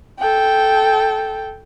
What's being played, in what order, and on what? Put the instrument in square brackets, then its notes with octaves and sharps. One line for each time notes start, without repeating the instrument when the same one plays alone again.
[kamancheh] A4 G5